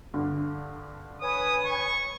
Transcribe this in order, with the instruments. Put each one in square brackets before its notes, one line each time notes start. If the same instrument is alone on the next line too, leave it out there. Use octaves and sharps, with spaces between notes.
[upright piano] G2 D3
[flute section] B4 C#5 G#5 [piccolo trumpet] D#6
[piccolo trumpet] C#6